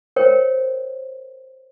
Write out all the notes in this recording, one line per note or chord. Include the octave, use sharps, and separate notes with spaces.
A#4 C5 C#5 G5